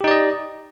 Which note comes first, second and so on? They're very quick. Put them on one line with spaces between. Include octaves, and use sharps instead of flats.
G4 D#4 D5 D#5